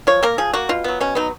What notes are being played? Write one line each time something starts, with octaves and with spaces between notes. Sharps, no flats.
F3 C#5
A#3 A#4
F3 G#4
A#3 F#4
B2 F4
F#3 B3
B2 C#4
F#3 B3 D#4